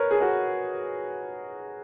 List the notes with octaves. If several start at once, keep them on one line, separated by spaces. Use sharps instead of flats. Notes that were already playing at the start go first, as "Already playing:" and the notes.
Already playing: A#4 B4 C#5
G#4
F#4 A#4